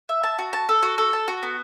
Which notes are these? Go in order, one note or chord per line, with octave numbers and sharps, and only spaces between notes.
E5
A5
F#4
A5
A4
F#4
A4
A5
F#4
B3